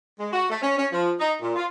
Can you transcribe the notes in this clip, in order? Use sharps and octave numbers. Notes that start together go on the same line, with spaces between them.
G#3
F#4
A3
C#4
C#4
F3
D#4
A#2
F4